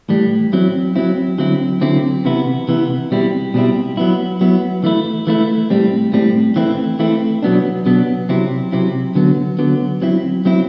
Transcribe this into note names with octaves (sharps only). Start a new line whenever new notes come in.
A2 E3 G3
F#3 C4 E4
F#3 C4 E4
D3 F#3 C4 E4
D3 F#3 C4 E4
C3 E3 B3 E4
C3 E3 B3 E4
B2 G3 C4 E4
B2 G3 C4 E4
F#3 B3 E4
F#3 B3 E4
E3 A3 E4
E3 A3 E4
A2 G3 C4
A2 G3 C4
E3 A3 C4 E4
E3 A3 C4 E4
B2 F#3 B3 D4
B2 F#3 B3 D4
C3 F#3 C4 E4
C3 F#3 C4 E4
D3 F#3 B3
D3 F#3 B3
F#3 C4 E4
F#3 C4 E4